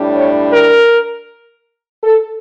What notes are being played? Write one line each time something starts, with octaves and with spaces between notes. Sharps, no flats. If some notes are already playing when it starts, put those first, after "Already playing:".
Already playing: A2 G3 D4
C#5
A#4
A4